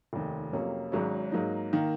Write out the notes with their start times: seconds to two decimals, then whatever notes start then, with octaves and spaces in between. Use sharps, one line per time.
0.13 F1 D#2 D#3
0.53 F2 C3 F#3 A#3 C#4
0.92 G#1 G#2 F#3 C#4
1.32 G#2 F#3 A#3 D#4
1.73 D#3 A#3